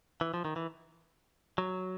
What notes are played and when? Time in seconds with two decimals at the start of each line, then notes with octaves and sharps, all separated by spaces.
0.21 E3
0.34 F3
0.45 D#3
0.56 E3
1.58 F#3